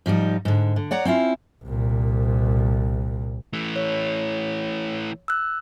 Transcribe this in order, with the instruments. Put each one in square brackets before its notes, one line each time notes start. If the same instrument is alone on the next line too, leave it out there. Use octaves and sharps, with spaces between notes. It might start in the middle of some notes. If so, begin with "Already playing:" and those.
[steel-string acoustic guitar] G#2 F3 G3 D#4
G#2 D3
D3
C#5 D5 F#5 A#5
C4 C#4 E4 F4
[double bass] C2 A#2
[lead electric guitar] E3 A3
[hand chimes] C#5
E6 F#6